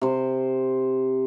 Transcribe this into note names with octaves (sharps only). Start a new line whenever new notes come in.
C3 C5